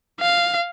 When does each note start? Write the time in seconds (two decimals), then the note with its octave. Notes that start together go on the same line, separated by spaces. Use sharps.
0.20 F5